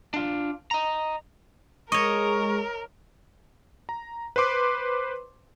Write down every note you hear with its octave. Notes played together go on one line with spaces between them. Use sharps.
D4 F4
D#5 A#5
G#3 A#4 C#5 D#5 C#6
A#5
B4 C5 C6 D6